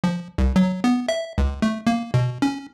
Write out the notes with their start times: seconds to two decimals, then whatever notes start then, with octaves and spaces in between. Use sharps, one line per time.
0.04 F3
0.38 C2
0.56 F#3
0.84 B3
1.09 E5
1.38 C#2
1.62 A3
1.87 A#3
2.14 B2
2.42 C#4